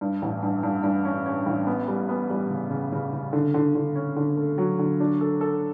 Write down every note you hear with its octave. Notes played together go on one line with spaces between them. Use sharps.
G2
A1
G2
G2
G2
C#4
C#4
A1
B3
G3
B3
G3
C#3
C#3
C#3
C#3
D3
D3
D3
C#4
D3
A3
F#3
D3
D4
A4
A4